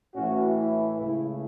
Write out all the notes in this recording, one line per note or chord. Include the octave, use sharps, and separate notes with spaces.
A2 E3 A3 C#4 F#4
E4
C#2 C#3 A3 E4